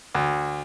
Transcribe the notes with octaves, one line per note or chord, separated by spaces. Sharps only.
D2